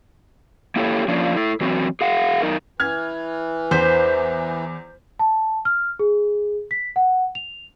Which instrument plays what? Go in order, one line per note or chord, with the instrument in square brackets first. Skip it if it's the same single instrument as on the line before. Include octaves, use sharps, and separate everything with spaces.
[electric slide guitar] A#3 E4 G4 A4 C#5
F3 A#3 C#4 D4 F4
E4 A4
E3 F#3 C4 F#4
G#4 F5 F#5
F#2 D#4 A#4
[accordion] E3 [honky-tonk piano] F6 G#6
[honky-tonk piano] E2 G6 B6 [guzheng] C5
[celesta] A5
F6
G#4
B6
F#5
F7